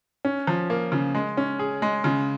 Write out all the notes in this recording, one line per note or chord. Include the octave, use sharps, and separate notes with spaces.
C#4
F3
A#3
C#3
G#3
C#4
G#4
G#3
C#3